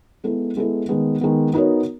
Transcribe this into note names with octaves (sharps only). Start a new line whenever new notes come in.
G#3 B3 E4 A4
G#3 B3 E4 A4
D#3 G#3 B3
D#3 G#3 B3
B3 D#4 F#4 A#4 C#5